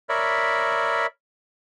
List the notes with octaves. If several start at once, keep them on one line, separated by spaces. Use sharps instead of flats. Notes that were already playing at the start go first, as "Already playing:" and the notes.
A#4 C#5 D5 E5 B5